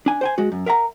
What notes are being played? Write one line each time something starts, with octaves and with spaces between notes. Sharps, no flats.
D4 G#5
C5 G5 G#5
G#3 F#4
F#2
A#4 E5 F#5 A#5